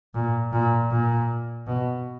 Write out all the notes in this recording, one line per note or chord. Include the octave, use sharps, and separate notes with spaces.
A#2
A#2
A#2
B2